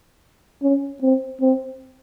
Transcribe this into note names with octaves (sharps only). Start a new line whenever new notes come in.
C#4
C4
C4